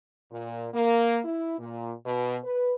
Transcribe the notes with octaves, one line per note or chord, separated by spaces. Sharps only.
A#2
A#3
E4
A#2
B2
B4